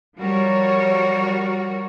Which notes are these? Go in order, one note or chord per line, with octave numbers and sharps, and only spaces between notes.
F3 G3 F#4 A#4 C#5